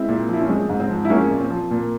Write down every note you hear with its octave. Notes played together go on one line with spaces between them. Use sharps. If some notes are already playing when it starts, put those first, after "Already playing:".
Already playing: G#3 C4 E4
A#2
F3 E4
C#4
G#3 C4
G#2
C4
F3
E4
G#3 A#3 C#4
A#2
C4
F3
A#2 A#3